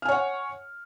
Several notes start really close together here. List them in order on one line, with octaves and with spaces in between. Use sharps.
F6 G#5 C#5 F#5